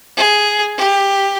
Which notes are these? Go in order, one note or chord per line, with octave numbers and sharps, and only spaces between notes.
G#4
G4